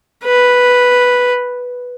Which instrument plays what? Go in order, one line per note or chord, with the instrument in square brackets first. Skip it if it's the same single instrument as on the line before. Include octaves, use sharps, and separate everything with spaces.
[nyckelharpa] B4